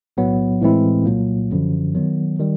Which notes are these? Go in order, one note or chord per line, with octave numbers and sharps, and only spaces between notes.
B1 A2 F#3 B3
A2 E3 G#3 C4 E4
C2 A#2 F#3 A#3
G#1 F#2 D3 F3
D#3 F#3 B3
D#3 G3